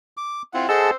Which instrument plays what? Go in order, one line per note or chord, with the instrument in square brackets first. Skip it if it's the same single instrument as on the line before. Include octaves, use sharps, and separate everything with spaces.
[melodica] D6
[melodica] C4 [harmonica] E4 F4 F#5
[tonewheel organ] G#4 A5 [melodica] A4 D#5 F#5 [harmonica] C5 E6